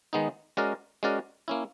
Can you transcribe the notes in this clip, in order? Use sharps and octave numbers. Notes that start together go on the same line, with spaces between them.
D#3 G#3 B3 D#4
G#3 C#4 F#4 A#4 D5
G#3 C#4 F#4 A#4 D5
A#3 C#4 E4